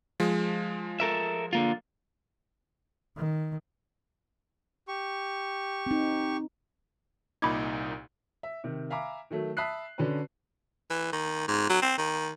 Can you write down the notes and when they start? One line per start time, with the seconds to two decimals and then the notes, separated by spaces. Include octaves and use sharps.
0.20 F3 G#3
1.00 A4 A#4 E5
1.53 D3 A#3 F4
3.17 D#3
4.88 G4 C#6
5.86 C4 D#4
7.42 C2 A#2 D#4 B5 D6 G#6
8.43 E5
8.64 C3 D#3
8.90 E5 F5 G#5 A#5 B5 D6
9.30 D#3 F#3 A3
9.57 E5 A5 B5 D#6 F#6 C7
9.98 D3 C#4 D4 F#4 B4
10.90 E3
11.13 D#3
11.48 G#2
11.70 F#3
11.82 C4
11.98 D#3